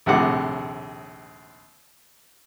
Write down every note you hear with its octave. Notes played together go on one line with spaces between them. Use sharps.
A#1 D#2 A2 C3 F#5 D6